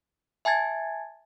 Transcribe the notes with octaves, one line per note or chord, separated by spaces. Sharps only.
E5 G#5 A5 G#6 A6